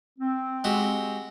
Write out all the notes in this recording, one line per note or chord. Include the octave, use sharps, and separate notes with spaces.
C4
G#3 F#4 G4